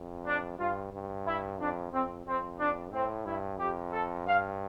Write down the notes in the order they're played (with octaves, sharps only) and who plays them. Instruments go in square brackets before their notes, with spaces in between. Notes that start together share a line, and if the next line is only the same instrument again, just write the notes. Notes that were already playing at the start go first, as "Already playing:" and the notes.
Already playing: [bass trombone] F2
[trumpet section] D4
[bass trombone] G2 [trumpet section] F4
[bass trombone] G2
[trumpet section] E4
[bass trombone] F2 [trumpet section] D4
[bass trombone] F2 [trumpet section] C4
[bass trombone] F2 [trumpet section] C4
[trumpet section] D4
[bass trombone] A2 [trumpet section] C4
[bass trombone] G2 [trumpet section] E4
[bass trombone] F2 [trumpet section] G4
[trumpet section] A4
[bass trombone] G2 [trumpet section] F5